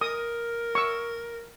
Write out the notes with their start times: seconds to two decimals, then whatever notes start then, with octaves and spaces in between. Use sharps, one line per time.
0.01 A#4 D#6
0.75 C#6 E6